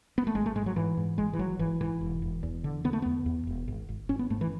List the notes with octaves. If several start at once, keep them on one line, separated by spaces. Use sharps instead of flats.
B3
A3
G#1 G#3
A3
G#2 G#3
F#3
G#2 E3
G#2
G#1 G#3
E3
G#1 F#3
G#1 E3
G#2 E3
E1
E1
E2
D3
D3 B3
A3
E2 B3
E2
E1
G#1
G#1
G#1 C#4
B3
G#2 A3
E3